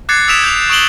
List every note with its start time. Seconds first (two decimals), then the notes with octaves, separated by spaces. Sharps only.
0.09 D6 F#6 G#6 A6 C7 C#7
0.28 D#6 E6 B6 D7 E7 F7
0.44 G6 G#6 F7
0.70 C#6 D#6 D7 E7 F#7 G7